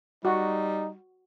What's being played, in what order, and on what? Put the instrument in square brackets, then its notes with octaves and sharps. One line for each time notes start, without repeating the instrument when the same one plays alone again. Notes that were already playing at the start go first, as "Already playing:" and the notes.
[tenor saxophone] G3 [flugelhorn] D#4 [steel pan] F#4